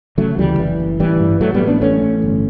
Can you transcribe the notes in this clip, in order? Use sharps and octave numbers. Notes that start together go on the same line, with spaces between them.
C#3 F#3 A3
D2 E3 G3
F#1 E3
F#1
A1 E3 G3
G2
A2 F#3 A3
G3 B3
A1
B3 D4
A1 A3 C#4
A1
G1